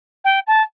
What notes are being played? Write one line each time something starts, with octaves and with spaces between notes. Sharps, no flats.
G5
A5